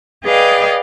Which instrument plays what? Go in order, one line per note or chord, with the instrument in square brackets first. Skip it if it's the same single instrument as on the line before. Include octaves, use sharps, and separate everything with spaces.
[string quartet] G#4 B4 D5 D#5 F5 G5